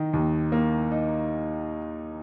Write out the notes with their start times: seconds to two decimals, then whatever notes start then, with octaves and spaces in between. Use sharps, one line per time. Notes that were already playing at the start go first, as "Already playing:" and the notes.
Already playing: D#3 D#4
0.13 D#2
0.52 A#3
0.92 D#4